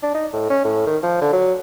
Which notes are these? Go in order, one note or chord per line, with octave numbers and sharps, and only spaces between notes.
D4
D#4
A2
C#4
A2
D#3
F3
D3
F#3